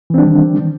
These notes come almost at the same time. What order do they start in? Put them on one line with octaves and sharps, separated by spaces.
E3 C4 D4 G3 D#3